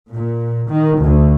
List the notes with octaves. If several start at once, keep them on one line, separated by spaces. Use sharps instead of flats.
A#2
D#3
D2